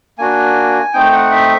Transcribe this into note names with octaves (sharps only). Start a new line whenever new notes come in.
A#3 D4 F#4 G#5
A3 C4 D#4 G5
F#5
E5